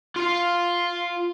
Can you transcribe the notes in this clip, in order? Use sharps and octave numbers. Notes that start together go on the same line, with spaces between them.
F4 F5